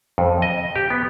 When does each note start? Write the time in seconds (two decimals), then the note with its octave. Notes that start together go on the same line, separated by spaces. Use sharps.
0.18 F2
0.42 D#5
0.76 G4
0.90 B3